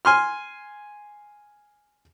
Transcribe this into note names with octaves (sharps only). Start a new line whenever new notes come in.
G#5 C6 F6